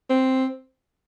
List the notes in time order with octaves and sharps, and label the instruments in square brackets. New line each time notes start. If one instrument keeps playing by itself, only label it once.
[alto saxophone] C4